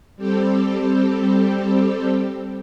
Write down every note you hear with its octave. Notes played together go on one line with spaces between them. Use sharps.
G3 C4 G4 A4